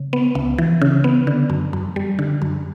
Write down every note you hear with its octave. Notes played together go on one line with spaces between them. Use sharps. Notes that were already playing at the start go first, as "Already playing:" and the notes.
Already playing: C#3
B3
C#2
E3
C#3
B3
D3
F#2
F#2
G3
D3
F#2